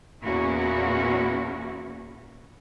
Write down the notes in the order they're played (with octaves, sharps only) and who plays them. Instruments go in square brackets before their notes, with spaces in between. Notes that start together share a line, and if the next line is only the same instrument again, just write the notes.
[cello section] E2 A#2 A#3 C#4 E4 F#4